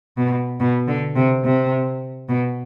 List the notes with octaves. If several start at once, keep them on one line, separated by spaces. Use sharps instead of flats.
B2
B2
D3
C3
C3
B2